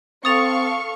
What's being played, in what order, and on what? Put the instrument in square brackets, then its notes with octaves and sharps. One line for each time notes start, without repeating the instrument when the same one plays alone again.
[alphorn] C4 [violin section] A4 F5 C#6 [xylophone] D#6 A6 F7